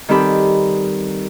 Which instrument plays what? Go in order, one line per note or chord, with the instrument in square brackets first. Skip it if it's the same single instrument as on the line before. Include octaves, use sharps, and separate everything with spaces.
[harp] D#3 G3 C4 G4 A4 B5